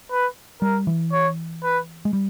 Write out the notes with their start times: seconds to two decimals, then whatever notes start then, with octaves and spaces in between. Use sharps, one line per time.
0.11 B4
0.62 G3 A#4
0.87 E3
1.13 C#5
1.63 B4
2.05 G#3
2.13 G3